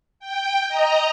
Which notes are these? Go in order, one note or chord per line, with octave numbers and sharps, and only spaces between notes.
G5
D#5 A#5